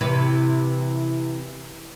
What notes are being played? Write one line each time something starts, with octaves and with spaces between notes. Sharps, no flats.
C3 E3 B4